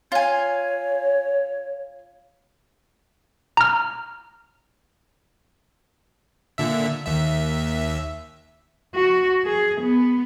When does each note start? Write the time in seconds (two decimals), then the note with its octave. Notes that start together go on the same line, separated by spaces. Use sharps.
0.12 F4 C#5 G#5
3.57 A#5 F6
6.58 A#2 D3 E5
7.06 D#2 E5
8.94 F#4
9.45 G#4
9.81 B3